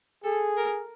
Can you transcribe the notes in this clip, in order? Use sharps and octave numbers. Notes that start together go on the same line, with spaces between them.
G#4 A4
A#4